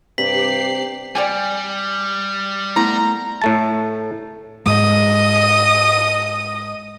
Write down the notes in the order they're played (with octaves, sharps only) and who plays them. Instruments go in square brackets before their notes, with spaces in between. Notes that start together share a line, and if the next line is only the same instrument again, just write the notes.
[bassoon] G2 [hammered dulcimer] C3 [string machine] G4 C7 [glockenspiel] B6 F#7
[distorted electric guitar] G3 [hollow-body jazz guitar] D5 G5 G#5
[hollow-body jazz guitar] A3 B3 [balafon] E4 [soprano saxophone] A#5
[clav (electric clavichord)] A2 A3 A5
[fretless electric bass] G#2 G#3 [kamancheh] D#5 D#6